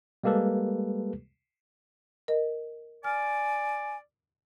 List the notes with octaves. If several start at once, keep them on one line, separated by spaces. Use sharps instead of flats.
G3 G#3 A#3 G4 A4 B4
A#4 D#5
D5 G#5 F6